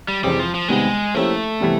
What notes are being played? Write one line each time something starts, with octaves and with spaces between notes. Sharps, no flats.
G3
F2 C3 E3 G3 G#3 C4
F3
F3
C3 D#3 G3 G#3 B3
F3 A3 A#3 C#4 E4 G4
C3 E3 G3 B3